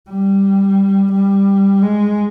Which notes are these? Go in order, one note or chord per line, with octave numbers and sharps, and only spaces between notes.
G3
G3
G#3